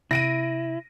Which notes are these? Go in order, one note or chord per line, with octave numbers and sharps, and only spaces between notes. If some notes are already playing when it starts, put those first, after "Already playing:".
C3 E4 A#6 D7 D#7